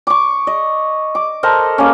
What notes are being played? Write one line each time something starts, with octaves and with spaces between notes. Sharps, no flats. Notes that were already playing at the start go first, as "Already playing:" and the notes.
C#6 D6
D#5
D6
A4 A#4 C5 D#5
A#3 C#4